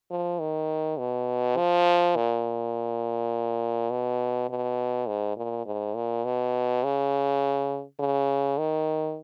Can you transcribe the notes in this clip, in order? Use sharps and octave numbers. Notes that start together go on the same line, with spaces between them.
F3
D#3
B2
F3
A#2
B2
B2
G#2
A#2
G#2
A#2
B2
C#3
C#3
D#3